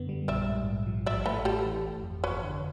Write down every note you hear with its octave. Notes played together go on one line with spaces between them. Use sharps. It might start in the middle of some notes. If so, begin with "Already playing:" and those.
Already playing: F#2 D3 B3
G3
A#1 D5 E5
G#2
A#1
F3
A1 D5 E5
A2 A4 B4
A3 G4 A4
E3
G1
F2
G1 B4 C#5
D3